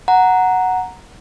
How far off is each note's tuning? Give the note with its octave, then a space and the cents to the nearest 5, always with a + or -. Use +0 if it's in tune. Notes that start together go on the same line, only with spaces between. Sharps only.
F#5 +0 A#5 +0